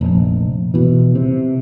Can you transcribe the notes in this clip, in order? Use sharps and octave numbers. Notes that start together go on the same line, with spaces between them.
F1 A#1
B2 E3
C3